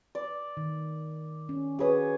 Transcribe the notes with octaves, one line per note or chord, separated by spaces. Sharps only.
D5
D#3
C#4
F#4 G#4 B4 C#5 D#6